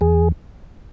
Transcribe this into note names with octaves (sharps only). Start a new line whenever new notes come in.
E2 G#4